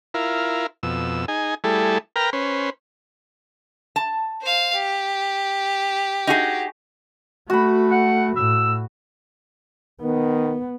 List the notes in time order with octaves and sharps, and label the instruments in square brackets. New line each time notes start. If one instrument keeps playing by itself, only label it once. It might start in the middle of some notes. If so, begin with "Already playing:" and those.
[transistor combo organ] E4 F4 A#4
F2 B2 E6
D#4 G#4 G#5
G3 A3 E4 G#4 A4
A#4 B4 G5 A#5 F6
C#4 B4 C5
[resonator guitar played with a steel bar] A5
[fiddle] C5 F5
G4
[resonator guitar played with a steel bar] D#4 F#4 G#4
[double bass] A3 [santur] F#4 B5
[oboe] F#5
[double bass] A2 [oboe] E6
[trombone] D#3 [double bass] B3